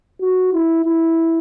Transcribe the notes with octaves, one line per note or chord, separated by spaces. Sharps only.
F#4
E4
E4